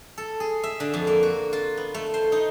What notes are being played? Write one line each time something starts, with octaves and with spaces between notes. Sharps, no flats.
A4
G#4
E5
D3
F2
A#3
F#4
F4
B3
A3
C5
D#4